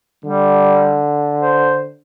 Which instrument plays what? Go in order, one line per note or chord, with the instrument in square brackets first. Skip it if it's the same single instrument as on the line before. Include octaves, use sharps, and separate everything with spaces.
[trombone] D3 [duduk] G3
[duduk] C5